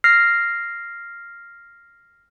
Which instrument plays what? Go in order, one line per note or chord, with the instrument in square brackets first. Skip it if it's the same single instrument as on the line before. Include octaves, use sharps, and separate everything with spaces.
[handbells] F6 A#6 C7